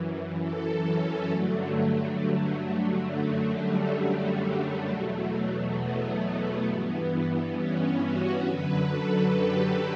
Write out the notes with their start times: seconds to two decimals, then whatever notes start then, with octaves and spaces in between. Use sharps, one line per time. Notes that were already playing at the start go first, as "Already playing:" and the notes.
Already playing: F#2 E3
0.41 A4
0.86 C#4
1.30 G2 D3 F#3 A3
3.10 F#2 D3 F#3 A3
3.54 G3
3.99 A3
4.89 E2 B2 F#3
5.78 B3
6.67 G2 E3
7.58 C#4
8.02 F#4
8.46 F#2 D3 F#3 B4
8.91 A4
9.36 G4